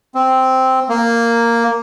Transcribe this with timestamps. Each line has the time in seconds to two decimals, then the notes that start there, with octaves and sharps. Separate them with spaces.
0.15 C4
0.89 A#3